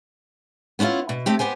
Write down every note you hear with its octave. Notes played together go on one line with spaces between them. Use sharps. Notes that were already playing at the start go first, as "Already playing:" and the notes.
B3 C#4 D4 E4 F4
B2
A3 C4 G4
B3 G4 C5 G#5